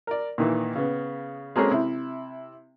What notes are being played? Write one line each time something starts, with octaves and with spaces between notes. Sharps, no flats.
A#4 D5
A#2 D#3 E3
C#3 B3
G#3 A#3 C4 C#4 G#4 A4
C3 E4